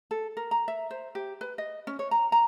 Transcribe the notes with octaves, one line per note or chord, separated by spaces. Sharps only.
A4
A#4
A#5
E5
C5
G4
B4
D#5
C#4
C#5
A#5
A#5